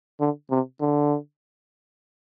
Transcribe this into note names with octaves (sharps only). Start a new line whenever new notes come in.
D3
C3
D3